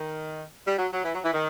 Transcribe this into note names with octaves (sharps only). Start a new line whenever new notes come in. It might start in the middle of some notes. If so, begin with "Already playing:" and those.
Already playing: D#3
G3
F#3
F#3
E3
F#3
E3
D#3